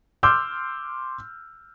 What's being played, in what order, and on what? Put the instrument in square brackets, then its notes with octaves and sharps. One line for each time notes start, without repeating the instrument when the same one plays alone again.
[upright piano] C6 D6 E6 F6 G6